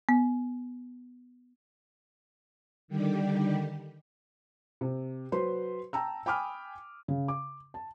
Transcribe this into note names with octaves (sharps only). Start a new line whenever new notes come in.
B3
D3 D#3 G3 G4
C3
F#3 B4 C5 C6
G5 A5 A#5 E6
G5 G#5 B5 D6 D#6 F6
C#3
D6
A5